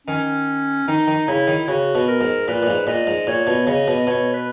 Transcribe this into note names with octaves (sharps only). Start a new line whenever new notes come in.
D#3 C#4
D#3 D#4
D#3
C#3 E4
D#3
C#3 F#4
B2
A#4
G#2
A#2 B4
A#2
G#2
A#2 D#5
G#2
A#2 C#5
B2
C#3 D#5
B2
B2 C#5
B4